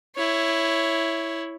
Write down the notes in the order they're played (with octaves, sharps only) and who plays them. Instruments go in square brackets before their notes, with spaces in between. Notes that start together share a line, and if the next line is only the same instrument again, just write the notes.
[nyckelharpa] E4 C#5